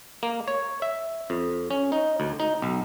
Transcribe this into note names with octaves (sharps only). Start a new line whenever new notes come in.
A#3
C#5
E5
F2
C#4
D#4
D2
D#4
B1